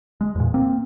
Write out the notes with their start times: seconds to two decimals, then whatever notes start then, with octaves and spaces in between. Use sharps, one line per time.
0.21 G#3
0.35 E2 A#2
0.54 A#3 C4